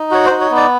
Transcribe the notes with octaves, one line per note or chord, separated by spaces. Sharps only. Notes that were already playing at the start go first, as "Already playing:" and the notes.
Already playing: D#4
F#4 C#5
D#4 C5
C#5
B3
D5